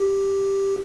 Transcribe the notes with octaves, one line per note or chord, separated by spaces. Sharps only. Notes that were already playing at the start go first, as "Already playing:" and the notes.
Already playing: G4